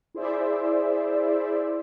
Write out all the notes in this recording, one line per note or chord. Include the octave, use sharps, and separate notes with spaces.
E4 G#4 C5 D5 E5